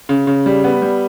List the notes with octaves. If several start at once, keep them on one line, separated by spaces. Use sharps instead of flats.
C#3
C#3
G3
B3
G3